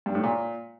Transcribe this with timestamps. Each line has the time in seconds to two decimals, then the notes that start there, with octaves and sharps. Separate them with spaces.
0.06 G2
0.15 A2
0.24 A#2